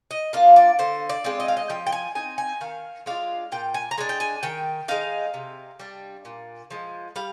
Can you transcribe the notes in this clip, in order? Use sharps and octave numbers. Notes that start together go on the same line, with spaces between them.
D#5
A#3 D4 F4 F5
D5
D3 C5
D5
G#3 C4 F4
D#5
F5
D#5
F3 G5
G5
G#5
C4 D#4 G#5
G#5
D#3 F5
G#3 D4 F4 F5
A#2 G5
G#5
A#5
G#3 D4 G#5
G5
G#5
D#3 G5
G#3 D#4 F5
C3
G3 D4
A#2
F3 G#3
G3 F5